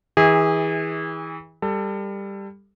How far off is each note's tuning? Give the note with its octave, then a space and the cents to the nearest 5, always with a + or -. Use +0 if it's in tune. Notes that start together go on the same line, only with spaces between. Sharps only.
E3 -30 G#4 -25 E5 -45
G3 +15 A4 +20